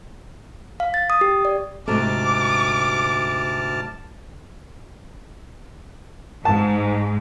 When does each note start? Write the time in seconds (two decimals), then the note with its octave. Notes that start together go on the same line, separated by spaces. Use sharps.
0.80 F5
0.94 A6
1.10 D#6
1.21 G4
1.45 D5
1.88 D2 G#2 C3 F#3 A3 A5 D6 F6
6.45 G#2 A5